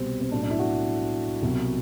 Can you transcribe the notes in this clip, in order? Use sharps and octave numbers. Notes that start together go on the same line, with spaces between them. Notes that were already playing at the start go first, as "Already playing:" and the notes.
Already playing: C2 B2 G3 C4
C4
B1 A2 F#3 D4
D4
E4
F#4
C2 B2 F#3